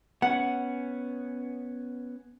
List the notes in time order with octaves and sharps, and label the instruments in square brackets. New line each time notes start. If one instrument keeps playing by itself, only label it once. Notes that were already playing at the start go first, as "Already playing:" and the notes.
[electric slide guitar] B3 C#4 [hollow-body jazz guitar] F#5